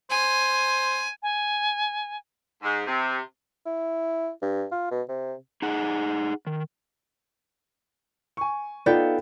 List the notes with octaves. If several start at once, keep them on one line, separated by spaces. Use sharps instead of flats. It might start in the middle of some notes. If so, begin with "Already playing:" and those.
C5 G#5
G#5
G#2
C3
E4
G2
F4
B2
C3
D#4 G#4 F#5
D#3
G#5 C#6
B3 D#4 F4 A4 D5 F5 G5